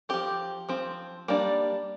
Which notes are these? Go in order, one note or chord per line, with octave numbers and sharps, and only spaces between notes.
F3 C4 G4
F3 C4
G3 A#3 D4